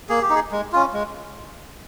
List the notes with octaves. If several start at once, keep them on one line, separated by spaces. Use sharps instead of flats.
A#3 G#4
G4
D#4
G#4
G#3
C#4 F4
G#3